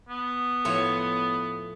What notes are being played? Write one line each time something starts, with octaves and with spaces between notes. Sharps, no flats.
B3
A2 F3 C#5